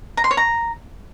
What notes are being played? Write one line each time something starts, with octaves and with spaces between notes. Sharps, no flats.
A#5
C6
C#5
A#5